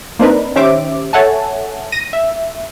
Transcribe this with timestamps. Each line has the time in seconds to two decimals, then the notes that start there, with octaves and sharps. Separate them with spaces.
0.19 A#3 C4 D4 D#4 A#4 B4
0.56 D#3 C#4 G4 C5 E5 D6
1.13 A4 C#5 E5 F#5 G#5 A5
1.92 A#6 D#7
2.13 E5